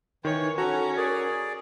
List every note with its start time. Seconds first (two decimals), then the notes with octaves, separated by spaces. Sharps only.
0.25 D#3 E3 C#5
0.58 C#4 F#4 A4 A#5
0.97 G#4 A#4 D5